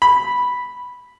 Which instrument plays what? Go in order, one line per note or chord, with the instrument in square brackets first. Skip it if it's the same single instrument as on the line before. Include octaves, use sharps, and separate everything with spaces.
[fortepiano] B5